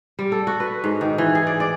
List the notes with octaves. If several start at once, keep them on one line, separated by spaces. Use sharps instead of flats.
G3
A4
F#4
B4
G#2
D#3
E3
G#4
D5
D5